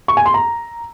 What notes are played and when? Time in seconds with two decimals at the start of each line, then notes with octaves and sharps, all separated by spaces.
0.08 C#6
0.17 G#5
0.26 C6
0.34 A#5